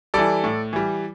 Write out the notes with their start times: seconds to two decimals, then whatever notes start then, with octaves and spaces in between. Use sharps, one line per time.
0.14 E3 G3 A4 D5
0.44 A2
0.73 E3 G3